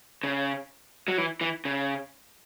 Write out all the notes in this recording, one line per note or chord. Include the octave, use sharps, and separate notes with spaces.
C#3
F#3
E3
E3
C#3